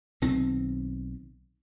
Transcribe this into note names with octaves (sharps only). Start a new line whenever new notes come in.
B1 D#3 C4